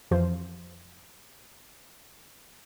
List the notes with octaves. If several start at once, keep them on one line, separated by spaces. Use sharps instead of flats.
F2 E3 F3 F4 C5